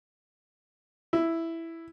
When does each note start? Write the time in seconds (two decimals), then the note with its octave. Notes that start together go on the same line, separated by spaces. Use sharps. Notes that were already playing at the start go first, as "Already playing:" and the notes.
1.13 E4